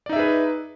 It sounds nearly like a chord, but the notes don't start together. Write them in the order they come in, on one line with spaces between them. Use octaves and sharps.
D5 D#4 E5 G#4 B4